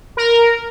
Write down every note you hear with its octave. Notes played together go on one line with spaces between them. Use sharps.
A#4